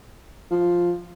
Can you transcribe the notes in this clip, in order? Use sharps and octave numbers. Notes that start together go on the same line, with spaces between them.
F3